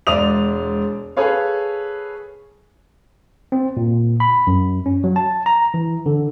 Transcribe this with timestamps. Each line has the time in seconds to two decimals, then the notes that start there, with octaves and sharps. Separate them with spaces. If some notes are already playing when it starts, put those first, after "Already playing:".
0.07 E1 G#3 D5 D#6 F7
1.17 G#4 A4 B4 C#5 F5
3.52 C4
3.77 A#2
4.20 B5
4.47 F#2
4.86 C#4
5.04 F#3
5.16 A5
5.46 A#5
5.74 E3
6.06 D3